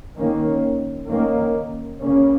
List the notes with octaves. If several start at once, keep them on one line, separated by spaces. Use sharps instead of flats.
D#3 A#3 C#4
D#3 A#3 C#4
C#3 A#3 C#4